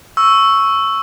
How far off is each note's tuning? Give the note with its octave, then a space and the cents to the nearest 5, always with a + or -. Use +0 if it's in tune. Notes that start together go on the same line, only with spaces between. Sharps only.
C#6 +0 E6 +0